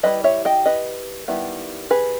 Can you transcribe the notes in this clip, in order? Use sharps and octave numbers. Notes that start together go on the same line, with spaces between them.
G3 B3 E4 B4 D#5
C#5 E5
D#5 G5
B4 D#5
D#3 G3 B3 E4
G#4 B4